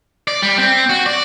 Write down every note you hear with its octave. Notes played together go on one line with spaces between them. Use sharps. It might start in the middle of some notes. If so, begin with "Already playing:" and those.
D5
G3
C4
F#4
D5